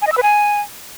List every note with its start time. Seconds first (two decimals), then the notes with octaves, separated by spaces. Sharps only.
0.02 G#5
0.07 D#5
0.12 E6
0.17 B4
0.23 G#5